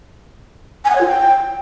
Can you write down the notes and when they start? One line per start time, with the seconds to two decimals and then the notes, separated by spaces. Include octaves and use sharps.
0.85 G#5
0.90 F#5
0.95 C#5
1.01 F4
1.06 G5